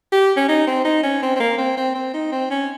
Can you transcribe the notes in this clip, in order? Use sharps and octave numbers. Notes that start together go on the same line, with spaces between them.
G4
C#4
D#4
C4
D#4
C#4
C4
C4
A#3
C4
C4
C4
D#4
C4
C#4